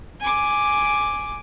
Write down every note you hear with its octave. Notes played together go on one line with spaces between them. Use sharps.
G#5 D6